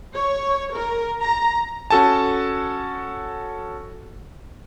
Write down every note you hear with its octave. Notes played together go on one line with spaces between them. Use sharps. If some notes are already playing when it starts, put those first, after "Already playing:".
C#5
A#4
A#5
C#4 F#4 A4 G#5 A5